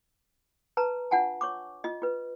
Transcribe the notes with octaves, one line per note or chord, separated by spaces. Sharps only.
B4 A5 A#5
D4 F4 F#5 G#5 A5
C#5 C#6 D6
F4 D#5
F4 B4